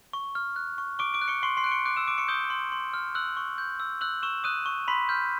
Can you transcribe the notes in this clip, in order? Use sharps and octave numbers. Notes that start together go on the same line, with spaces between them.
C#6
F6
F#6
C#6
C#6 D6 D7
D6 D7
F#6
C#6 C#7
C6 C#6 C7
C6 C7
F#6 D7
C#6 C#7
D6 F#6 D7
E6 E7
D6 D7
C#6 C#7
D#6 G6 G7
C6
C6
F6
E6 F#6 F#7
C#6
G6
E6
E6 F#6 F#7
C#6 E6 E7
D#6 F#6 D#7
C#6
B5 C6 B6
F6 G6